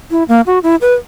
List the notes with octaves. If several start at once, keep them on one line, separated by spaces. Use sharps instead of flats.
E4
A#3
F#4
E4
B4